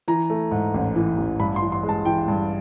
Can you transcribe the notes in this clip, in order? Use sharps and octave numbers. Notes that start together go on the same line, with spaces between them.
E3 A#5
A3
G#2
A1
E3
A1
G2 B5
C6
E3
C6
G#3
A5
E3 G5
G2